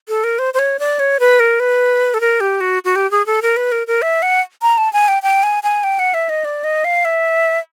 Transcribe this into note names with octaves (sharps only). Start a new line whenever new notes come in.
A4
A#4
C5
C5
C#5
D5
C#5
B4
A#4
B4
A4
A#4
G4
F#4
F#4
G4
G#4
A4
A#4
B4
A#4
A#4
E5
F#5
A#5
A5
G#5
G5
G5
G#5
G#5
G5
F#5
E5
D#5
D5
D#5
F5
E5